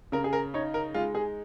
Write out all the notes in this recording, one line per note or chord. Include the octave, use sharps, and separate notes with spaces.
C#3 A#4
G#4
A#4
D#4 C#5
A#4
G#3 F4
G#4